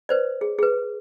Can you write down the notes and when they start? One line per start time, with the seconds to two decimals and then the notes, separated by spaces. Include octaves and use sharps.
0.09 B4 C5 D5
0.41 G#4
0.59 G#4 B4